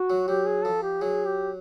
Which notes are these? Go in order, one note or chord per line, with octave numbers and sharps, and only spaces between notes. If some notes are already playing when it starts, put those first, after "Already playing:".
Already playing: F#4
F#3
F#3 G4
G#4
F3 A4
G4
F#3 G#4
G4